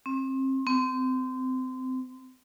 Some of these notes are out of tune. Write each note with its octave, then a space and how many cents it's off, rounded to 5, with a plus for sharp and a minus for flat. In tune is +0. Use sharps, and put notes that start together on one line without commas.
C4 +30
C4 -25